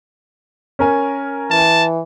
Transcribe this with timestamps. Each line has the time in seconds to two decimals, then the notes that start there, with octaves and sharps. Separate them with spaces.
0.79 C#4 A#4 G#5
1.51 E3 A5